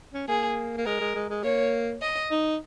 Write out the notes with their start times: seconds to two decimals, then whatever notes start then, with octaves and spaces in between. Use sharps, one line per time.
0.13 C#4
0.28 A#3 G#4
0.77 A#3
0.86 G#3 A#4
1.01 G#3
1.15 G#3
1.30 G#3
1.44 A#3 C#5
2.02 D#5
2.31 D#4